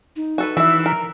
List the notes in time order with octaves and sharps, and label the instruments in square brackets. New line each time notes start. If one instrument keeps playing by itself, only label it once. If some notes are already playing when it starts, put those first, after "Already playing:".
[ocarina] D#4
[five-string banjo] F#4 A4 B4
[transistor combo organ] E3 [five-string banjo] F#4 E5 [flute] E6
[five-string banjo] A#4 [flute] A#5